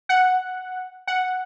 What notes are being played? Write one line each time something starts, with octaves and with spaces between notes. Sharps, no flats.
F#5
F#5